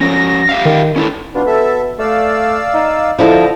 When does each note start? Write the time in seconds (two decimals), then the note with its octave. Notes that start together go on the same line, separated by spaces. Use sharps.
0.01 F3 C#4 A#6
0.49 G4 E5 F5
0.65 D#3
0.96 C#4 E4 A4
1.35 G#2 B2 D4 F4
1.47 A4 E5
1.99 A3 D5 F5 E6
2.74 D#4
3.19 A2 D3 F3 E4 A4 D#5